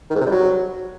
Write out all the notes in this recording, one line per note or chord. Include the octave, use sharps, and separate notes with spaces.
D#3
G#2
C3
G3
F#3